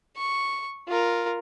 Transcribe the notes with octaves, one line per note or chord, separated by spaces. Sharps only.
C#6
F4 A#4